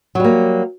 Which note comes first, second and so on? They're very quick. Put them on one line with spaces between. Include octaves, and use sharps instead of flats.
F#3 G3 A#3